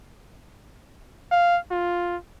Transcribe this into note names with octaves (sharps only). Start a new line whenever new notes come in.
F5
F4